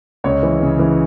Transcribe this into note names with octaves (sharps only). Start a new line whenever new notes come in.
C#2 C#5
E3
C#3
E3